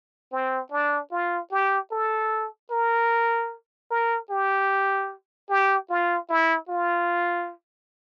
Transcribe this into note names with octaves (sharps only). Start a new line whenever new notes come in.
C4
D4
F4
G4
A4
A#4
A#4
G4
G4
F4
E4
F4